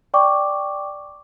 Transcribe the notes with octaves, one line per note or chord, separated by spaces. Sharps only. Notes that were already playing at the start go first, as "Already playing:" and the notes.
D5 G5 C#6 D6